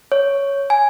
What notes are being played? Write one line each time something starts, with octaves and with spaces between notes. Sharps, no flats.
C#5
G#5